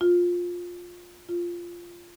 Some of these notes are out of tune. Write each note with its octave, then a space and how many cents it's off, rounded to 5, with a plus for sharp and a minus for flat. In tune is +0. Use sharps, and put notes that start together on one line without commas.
F4 +15
F4 -10